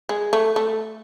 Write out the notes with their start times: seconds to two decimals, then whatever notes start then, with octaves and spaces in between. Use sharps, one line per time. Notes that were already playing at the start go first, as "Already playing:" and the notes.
0.09 G#3
0.33 A3
0.56 A3